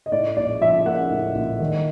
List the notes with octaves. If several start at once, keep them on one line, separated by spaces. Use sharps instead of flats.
D#5
A2 D5
A#1 D5
F3 E5
A#3 F#5
A2
A#1
D#3